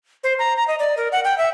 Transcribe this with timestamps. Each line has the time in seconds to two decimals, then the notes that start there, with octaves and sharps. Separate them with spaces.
0.24 C5
0.39 A#5
0.56 A#5
0.68 D#5
0.79 D5
0.97 A#4
1.12 F#5
1.24 G5
1.38 E5